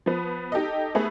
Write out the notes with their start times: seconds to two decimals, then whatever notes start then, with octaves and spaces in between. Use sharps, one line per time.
0.06 F3 B3
0.52 D#4 G4 A4 D#5
0.95 A3 B3 G#4